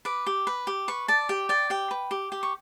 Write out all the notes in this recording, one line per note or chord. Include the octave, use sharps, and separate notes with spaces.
B4 D6
G4
B4
G4
B4 C#6
D5 A5
G4 G5
D5 G5
G4 G5
B4
G4
G4
C#6